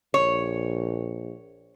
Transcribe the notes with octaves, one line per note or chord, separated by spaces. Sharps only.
A#1 C#5